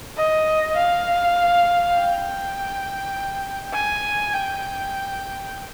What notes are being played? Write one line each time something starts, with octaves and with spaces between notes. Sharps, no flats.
D#5
F5
G5
G#5
G5